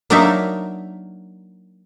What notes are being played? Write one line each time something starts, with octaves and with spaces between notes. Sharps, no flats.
F#3 A#3 D4 D#4 A#4 E5